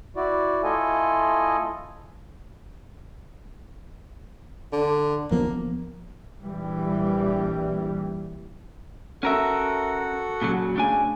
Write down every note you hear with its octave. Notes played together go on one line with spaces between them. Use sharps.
E4 F#4 D5
A3 E4 F4 A4 D#5 G#5
D3
D1 F3 A#3 B3
A#1 E3 G3
C#4 F#4 A4 A#4 E5 F#5
A#2 C#3 F#3
C#3 A3 D4 G#5